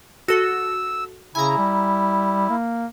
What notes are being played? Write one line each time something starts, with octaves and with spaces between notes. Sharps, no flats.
F#4 A4 E6
C#3 E4 G#5 A#5
G3
A#3